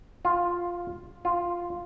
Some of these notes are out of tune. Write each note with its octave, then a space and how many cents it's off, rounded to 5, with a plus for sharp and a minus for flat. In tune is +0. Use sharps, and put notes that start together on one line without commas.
F4 +5
F4 +0